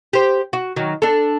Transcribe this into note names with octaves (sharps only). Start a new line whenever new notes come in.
G4 C5
F#4
D#3 F#3
D4 A4